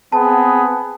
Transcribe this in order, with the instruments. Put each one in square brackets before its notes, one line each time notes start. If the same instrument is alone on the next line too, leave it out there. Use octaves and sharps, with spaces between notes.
[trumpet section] B3 C4 G#4 [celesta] A5